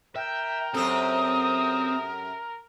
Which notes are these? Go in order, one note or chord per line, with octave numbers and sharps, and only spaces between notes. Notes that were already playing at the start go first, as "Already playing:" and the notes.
A#4 E5 G5
F#2 C4 G4 A4 D#6